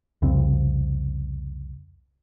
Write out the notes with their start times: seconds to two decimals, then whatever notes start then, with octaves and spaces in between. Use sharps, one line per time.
0.22 C2 F2 C#3 C4